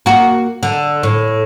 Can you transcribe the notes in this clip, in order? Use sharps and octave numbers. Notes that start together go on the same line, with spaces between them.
A#3 F#4
D3
A2